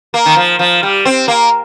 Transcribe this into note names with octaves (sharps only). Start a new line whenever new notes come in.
A#3
D#3
F3
F3
G3
C4
A#3